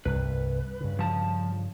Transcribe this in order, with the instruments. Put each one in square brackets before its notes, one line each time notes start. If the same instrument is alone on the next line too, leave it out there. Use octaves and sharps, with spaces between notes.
[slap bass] C2 G2 [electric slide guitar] B4
[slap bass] G2 C#3
[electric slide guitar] F3 A5